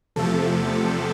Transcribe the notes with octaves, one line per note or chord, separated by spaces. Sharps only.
E2 C3 F3 A3 A4